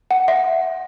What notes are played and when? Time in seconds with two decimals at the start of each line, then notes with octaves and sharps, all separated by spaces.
0.11 F#5
0.28 E5